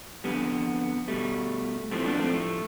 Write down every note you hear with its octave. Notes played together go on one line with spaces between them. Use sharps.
F2 D3 G3 B3
B2 G3 A3
A2 F3 A3 C4
B3 D4
A3 C4
A3